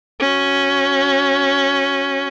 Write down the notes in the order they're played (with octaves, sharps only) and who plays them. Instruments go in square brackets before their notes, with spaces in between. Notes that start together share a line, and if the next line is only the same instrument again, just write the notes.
[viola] C#4 F#4